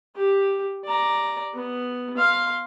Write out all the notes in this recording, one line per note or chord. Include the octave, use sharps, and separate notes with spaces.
G4
D5 A#5
B3
F5 C6